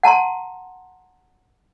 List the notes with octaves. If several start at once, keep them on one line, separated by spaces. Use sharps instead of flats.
F#5 A5 A#5 C6